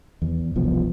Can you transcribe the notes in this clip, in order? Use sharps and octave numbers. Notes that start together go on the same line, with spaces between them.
E2
E1 C2 F3 B3